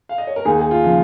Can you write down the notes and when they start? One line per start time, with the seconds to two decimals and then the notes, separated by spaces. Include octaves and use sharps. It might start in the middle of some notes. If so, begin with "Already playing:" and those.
0.09 F5
0.18 D#5
0.27 C#5
0.36 A#4
0.45 D#2 D#4 G#4
0.59 G#4
0.71 F4
0.84 C#3 F3